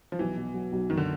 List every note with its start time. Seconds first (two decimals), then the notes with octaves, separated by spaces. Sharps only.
0.12 F3
0.19 B1 E3
0.37 B2
0.54 F#3
0.72 B1
0.90 F#1 D#3
0.97 D3